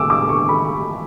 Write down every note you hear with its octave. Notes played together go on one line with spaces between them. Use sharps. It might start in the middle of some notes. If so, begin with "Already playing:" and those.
Already playing: A2 D6 E6
D6
C#6
B5